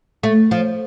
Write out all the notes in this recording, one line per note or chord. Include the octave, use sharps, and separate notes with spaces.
A3
F3